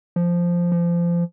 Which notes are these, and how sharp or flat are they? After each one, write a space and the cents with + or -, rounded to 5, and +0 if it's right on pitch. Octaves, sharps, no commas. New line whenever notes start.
F3 -5
F3 -25